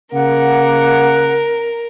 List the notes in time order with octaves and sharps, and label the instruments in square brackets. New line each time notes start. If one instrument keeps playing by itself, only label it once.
[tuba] C#3 [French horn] A#3 [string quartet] A#4 [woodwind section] F#5